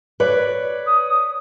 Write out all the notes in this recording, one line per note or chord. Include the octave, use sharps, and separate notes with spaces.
B4 C#5 D5
D#6